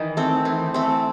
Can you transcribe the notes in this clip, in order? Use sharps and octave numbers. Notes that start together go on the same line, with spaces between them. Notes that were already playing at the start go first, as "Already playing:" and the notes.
Already playing: D#3 E3
A3 C4
E3
A3 C4